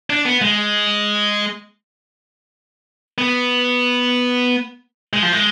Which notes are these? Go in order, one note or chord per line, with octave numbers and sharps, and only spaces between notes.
D4
B3
G#3
B3
G#3
F3
G#3